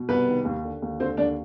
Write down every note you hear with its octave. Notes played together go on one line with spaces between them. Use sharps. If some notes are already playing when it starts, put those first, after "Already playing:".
Already playing: B2
C2 B3 B4
D#3
D#2
D3
D#2
D3 C4 C5
D#2 D4 D5